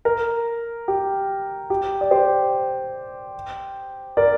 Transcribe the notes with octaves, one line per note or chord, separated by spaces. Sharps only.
A#4
G4
G4
D5
G4 C5
A#4 D5